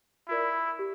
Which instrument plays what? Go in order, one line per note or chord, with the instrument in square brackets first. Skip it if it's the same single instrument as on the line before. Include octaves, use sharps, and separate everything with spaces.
[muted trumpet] E4 [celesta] F4 A#4 D5
[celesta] G4